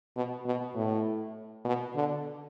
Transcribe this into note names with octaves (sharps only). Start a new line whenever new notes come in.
B2
B2
A2
B2
D3